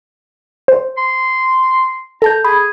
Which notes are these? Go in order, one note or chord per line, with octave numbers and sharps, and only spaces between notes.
C5
C6
A4 A5 A#5 G6
G#4 B5